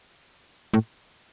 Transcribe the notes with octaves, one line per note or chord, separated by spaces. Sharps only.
A2